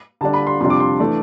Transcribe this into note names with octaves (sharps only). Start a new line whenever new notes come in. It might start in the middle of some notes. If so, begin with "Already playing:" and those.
D3 G3 D4 A5
B5
C6
F2 C3 G3 D4 C6
D6
C6
E3 A3 D4